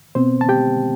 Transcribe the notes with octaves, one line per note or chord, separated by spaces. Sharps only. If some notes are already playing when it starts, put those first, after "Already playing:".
B2 B3 C4 C5
A5
G4 G5